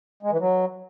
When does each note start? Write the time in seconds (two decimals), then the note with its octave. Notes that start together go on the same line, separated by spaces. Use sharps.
0.23 G#3
0.31 E3
0.40 F#3